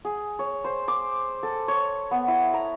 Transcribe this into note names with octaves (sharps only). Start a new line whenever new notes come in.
G#4
C#5
C5
D6
A4
C#5
B3
E4
A#5